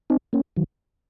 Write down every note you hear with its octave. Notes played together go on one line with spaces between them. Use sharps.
C4 D#4
A#3 C#4
D#3 F#3